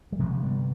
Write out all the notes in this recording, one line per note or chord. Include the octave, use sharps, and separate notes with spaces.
G3
G1 F2 C3 F3 G#3
G3 B3